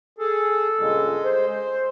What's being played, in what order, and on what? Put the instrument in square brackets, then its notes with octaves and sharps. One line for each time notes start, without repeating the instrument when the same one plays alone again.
[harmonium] G#4 [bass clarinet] A4
[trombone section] C#2 G2 A#2 [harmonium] G#3
[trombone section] C5